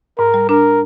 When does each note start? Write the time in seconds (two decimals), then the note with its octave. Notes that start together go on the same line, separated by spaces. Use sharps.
0.18 G#2 A#4
0.34 G3
0.49 D4 A#4